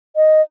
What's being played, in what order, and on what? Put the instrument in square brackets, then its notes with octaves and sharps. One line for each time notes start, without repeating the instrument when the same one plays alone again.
[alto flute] D#5